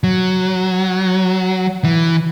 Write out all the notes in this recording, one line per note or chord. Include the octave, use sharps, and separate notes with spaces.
F#3
E3